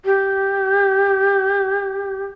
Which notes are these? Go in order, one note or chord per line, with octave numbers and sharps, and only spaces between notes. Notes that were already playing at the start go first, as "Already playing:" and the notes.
G4